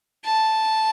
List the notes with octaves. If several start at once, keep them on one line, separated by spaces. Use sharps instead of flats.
A5